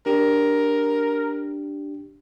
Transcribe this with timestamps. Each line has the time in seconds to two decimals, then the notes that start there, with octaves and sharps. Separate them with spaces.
0.06 D4 G4 A#4